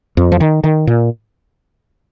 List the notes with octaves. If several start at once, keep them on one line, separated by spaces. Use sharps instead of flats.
F2
F3
D#3
D#3
A#2